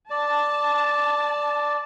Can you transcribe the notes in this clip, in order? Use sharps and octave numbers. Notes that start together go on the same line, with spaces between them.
D5 A5